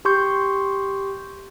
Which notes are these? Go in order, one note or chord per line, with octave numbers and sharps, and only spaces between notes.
G4 C6 C#6 G6